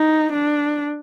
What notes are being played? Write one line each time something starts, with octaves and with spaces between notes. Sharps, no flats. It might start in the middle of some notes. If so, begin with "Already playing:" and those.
Already playing: D#4
D4